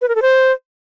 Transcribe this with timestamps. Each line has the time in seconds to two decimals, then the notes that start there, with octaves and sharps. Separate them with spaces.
0.02 B4
0.08 A#4
0.15 A4
0.22 C5